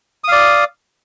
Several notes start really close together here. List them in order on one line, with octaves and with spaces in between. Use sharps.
D#6 F5 D5